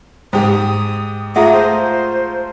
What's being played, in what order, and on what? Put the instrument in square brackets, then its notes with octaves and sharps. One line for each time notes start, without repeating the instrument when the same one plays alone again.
[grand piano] G#2 G4 [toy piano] C5 [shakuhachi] D#6
[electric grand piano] A3 F4 A#5 [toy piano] G#4 E5 F#5 [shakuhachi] D#6
[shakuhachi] C5